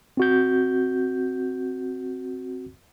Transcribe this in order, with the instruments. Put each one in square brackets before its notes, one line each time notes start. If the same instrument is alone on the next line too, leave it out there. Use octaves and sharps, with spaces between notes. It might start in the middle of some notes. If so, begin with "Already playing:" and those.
[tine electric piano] C4 F#4 G6